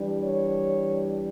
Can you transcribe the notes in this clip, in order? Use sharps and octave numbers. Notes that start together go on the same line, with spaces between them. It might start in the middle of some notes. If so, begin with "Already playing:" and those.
Already playing: E3 G3 D4
C#5